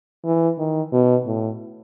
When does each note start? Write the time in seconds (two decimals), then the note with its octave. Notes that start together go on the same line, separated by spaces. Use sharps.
0.25 E3
0.59 D#3
0.93 B2
1.26 A2